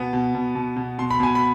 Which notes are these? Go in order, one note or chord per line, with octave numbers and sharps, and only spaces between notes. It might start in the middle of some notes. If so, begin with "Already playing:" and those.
Already playing: B2 B3 G#5
B2
B2
B2
B2
B2 C6
B5
B2 G#5
B5